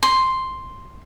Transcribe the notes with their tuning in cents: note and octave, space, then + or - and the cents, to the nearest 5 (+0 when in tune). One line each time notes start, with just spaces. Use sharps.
C6 +0